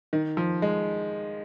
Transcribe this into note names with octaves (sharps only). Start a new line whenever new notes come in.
D#3
F3
G#3